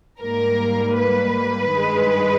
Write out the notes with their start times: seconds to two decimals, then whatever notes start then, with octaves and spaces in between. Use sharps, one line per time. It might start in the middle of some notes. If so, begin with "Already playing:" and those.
0.20 G#2 G3 A#3 A#4
0.97 B4
1.73 G2 D#3 G#3